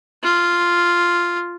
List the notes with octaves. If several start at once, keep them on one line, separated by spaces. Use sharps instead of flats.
F4